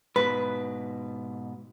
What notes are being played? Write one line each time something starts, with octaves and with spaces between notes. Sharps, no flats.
G#2 B2 B4